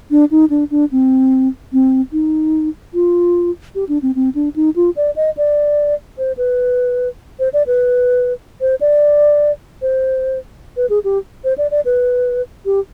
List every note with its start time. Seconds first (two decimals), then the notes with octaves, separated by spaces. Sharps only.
0.11 D4
0.31 D#4
0.50 D4
0.71 D4
0.92 C4
1.73 C4
2.12 D#4
2.94 F4
3.75 G4
3.89 D4
4.02 C4
4.15 C4
4.35 D4
4.56 D#4
4.76 F4
4.96 D5
5.16 D#5
5.37 D5
6.18 C5
6.37 B4
7.39 C5
7.53 D5
7.67 B4
8.61 C5
8.81 D5
9.82 C5
10.77 B4
10.90 G#4
11.04 G4
11.44 C5
11.58 D5
11.71 D5
11.85 B4
12.66 G4